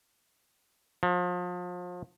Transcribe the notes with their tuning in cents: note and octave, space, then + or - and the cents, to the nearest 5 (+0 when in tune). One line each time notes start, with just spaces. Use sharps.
F3 +35